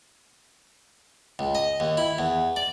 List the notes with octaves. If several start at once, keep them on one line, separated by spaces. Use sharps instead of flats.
C#2
D#5
D#2
E4
E2
D5